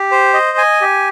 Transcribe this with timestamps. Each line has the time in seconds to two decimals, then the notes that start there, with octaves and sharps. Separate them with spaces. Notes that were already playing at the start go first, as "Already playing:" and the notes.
Already playing: G4
0.11 C5
0.34 D#5
0.58 G#5
0.81 G4